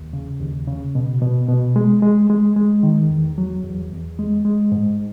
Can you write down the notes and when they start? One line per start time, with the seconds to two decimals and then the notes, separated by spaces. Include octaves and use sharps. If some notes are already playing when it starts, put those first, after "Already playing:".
Already playing: D#2
0.13 C#3
0.40 D#2
0.67 C#3
0.95 B2
1.22 B2
1.49 B2
1.76 G#3
2.02 G#3
2.30 G#3
2.56 G#3
2.83 D#3
3.10 E2
3.38 F#3
3.64 E2
3.91 E2
4.19 G#3
4.45 G#3
4.72 G#2